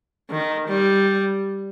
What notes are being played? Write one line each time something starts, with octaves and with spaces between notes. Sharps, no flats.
D#3
G3